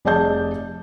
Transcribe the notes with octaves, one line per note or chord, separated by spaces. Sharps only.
F1 G#4 D5 D#5 A5 G6